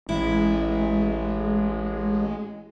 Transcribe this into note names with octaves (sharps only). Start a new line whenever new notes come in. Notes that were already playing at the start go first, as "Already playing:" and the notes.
A1 G#3 E4